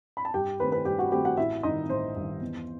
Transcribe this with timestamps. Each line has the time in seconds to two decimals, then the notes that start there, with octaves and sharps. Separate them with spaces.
0.17 B5
0.25 A5
0.34 G2 G4 G5
0.60 D#3 A3 C4 B4 B5
0.72 B4 B5
0.85 G2 G4 G5
0.99 F#4 F#5
1.11 D#3 A3 C4 G4 G5
1.25 F#4 F#5
1.37 A1 E4 E5
1.63 G2 D#3 D#4 D#5
1.89 A1 C5
2.16 G2 D#3
2.41 E2